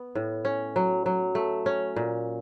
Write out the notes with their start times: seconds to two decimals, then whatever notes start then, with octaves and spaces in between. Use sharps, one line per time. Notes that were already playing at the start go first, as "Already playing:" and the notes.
Already playing: B3
0.15 A2
0.45 C#4
0.76 F#3
1.06 F#3
1.35 A3
1.66 C#4
1.96 A#2